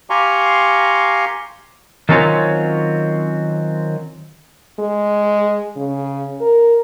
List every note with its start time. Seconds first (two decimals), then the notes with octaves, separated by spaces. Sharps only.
0.10 G4 F5 G#5 A#5 C6 C#6
2.09 D#3 F#3 C4 C#4 F4 C#5
4.79 G#3
5.77 C#3
6.41 A#4